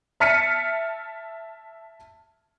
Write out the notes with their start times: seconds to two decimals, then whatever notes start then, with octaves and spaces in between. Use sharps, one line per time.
0.20 E5 A5 F6 B6 C#7 D#7